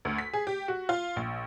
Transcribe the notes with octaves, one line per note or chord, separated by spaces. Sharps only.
D2
B6
G#4
G4
F#4
F4
A#1